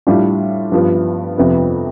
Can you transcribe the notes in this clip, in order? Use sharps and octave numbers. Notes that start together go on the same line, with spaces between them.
A2 G3 D4 F4
G2 F3 B3
F2 C3 F3 B3